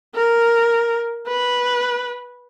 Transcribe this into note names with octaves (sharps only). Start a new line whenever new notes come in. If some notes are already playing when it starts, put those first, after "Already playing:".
A#4
B4